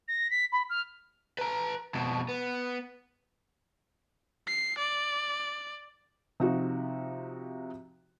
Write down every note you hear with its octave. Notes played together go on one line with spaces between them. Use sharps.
A#6
B6
B5
F6
B4 A#5
F2 B2
B3
C7
D5
C3 F3 D#4 F#4